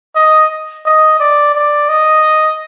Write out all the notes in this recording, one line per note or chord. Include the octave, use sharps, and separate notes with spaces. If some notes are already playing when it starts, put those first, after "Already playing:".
D#5
D#5
D5
D5
D#5